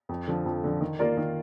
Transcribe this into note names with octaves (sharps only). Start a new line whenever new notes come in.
F2
D3 F3
F2
D3 F3
D#3
A#3 F4 A#4 D5
D#3